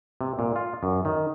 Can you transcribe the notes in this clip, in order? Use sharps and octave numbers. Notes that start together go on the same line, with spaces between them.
C3
A#2
F4
F#2
D#3